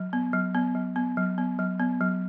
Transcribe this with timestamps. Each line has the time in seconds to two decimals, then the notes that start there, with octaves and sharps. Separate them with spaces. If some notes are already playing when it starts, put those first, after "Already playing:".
Already playing: F#3
0.13 B3
0.33 F#3
0.54 B3
0.75 F#3
0.96 B3
1.17 F#3
1.38 B3
1.59 F#3
1.80 B3
2.01 F#3